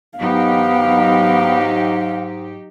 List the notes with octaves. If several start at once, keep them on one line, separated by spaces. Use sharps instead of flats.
G#2 F#3 B3 D#4 G4 F5